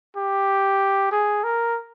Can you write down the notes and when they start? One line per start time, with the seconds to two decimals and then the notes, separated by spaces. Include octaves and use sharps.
0.17 G4
1.12 G#4
1.44 A#4